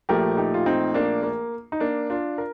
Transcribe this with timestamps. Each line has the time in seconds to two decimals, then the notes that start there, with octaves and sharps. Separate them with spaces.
0.09 A#1 A#2 F3 A3 G4 A#4
0.37 D#4 G4
0.54 F4
0.66 C4 D#4
0.94 A#3 D4
1.23 A#3
1.72 D#4
1.80 A#3 D4
2.10 D4 F4
2.38 A#4